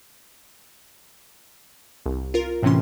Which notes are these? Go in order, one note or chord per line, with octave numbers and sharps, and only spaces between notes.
C2
F4 A#4
A2 C3 E3 C#4 C6